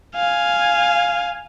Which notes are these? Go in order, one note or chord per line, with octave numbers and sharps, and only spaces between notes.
F5 G#5